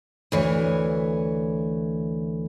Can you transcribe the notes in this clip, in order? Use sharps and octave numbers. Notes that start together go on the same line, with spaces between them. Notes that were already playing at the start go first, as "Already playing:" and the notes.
D2 E3 C#5